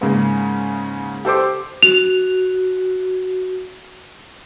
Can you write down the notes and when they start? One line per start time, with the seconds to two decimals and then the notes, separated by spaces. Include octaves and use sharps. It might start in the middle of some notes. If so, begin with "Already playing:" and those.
0.01 G#2 C#3 A#3
1.25 G4 A4 C5 D6
1.83 F#4 F7